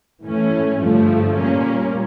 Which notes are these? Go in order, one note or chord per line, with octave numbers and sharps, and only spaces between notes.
A2 E3 A3 C#4
G2 D3 F3 A3
A#2 G3 A#3 C#4